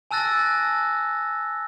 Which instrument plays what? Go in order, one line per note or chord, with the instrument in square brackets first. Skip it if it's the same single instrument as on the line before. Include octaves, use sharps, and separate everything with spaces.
[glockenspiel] G#5 A5 E6 F#6 A6 A#6